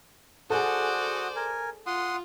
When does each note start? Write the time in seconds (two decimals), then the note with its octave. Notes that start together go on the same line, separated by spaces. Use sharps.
0.50 F#4 G#4 A4 C5 D5 F#5 D#6
1.36 A#4 G#5
1.86 F4 F#5 C6 D#6